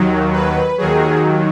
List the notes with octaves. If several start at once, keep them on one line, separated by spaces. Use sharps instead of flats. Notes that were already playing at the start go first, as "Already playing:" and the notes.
Already playing: D#2 D#3 F#3
B4
D#2 D#3 F#3 G#4